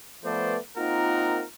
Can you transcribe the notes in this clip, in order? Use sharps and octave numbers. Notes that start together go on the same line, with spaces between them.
F3 A3 B3 B4 C5 D5
A#3 C4 D#4 F4 A#4 F#5